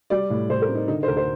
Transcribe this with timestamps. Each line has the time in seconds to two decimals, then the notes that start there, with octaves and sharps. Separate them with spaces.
0.10 G3 D5
0.30 A2
0.49 A2 C5
0.62 A#4
0.69 C4
0.75 D#4
0.88 D3 D#4
1.03 C5
1.07 D2 A#4
1.17 C5